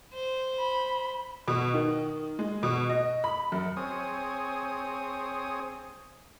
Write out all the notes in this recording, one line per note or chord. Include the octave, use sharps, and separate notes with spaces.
C5
B5
B2
D#3
G#3
B2
D#5
B5
F#2
C4 G#4 C#5 D#6